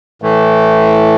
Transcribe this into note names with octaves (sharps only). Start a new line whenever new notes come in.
A2 E3 A3